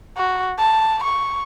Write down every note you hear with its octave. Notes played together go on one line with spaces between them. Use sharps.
F#4
A5
C#6